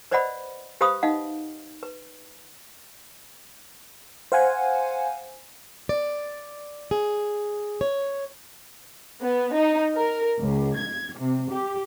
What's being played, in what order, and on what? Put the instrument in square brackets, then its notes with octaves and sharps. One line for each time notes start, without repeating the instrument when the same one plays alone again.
[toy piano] B4 C5 D5 D#5 F#5 B5
G4 B4 C5 F5 B5 D#6
D#4 D#5 F5 F#5
B4
[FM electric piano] C5 F5 F#5 G#5
[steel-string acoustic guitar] D5
G#4
C#5
[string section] B3
D#4
A#4
C#2
G#6
C3
G4